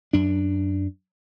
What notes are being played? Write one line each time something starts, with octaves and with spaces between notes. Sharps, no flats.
F#2 D4